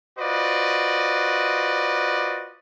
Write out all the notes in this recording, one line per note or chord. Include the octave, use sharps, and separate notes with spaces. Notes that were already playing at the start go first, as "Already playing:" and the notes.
F4 F#4 B4 C5 D5 D#5